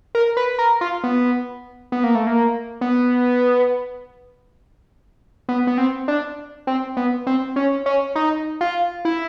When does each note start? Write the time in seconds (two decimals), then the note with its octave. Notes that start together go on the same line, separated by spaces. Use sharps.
0.15 A#4
0.37 B4
0.59 A#4
0.81 F4
1.04 B3
1.92 B3
2.04 A#3
2.15 A3
2.27 A#3
2.81 B3
5.49 B3
5.67 B3
5.78 C4
6.08 D4
6.67 C4
6.97 B3
7.27 C4
7.56 C#4
7.86 C#4
8.15 D#4
8.61 F4
9.05 E4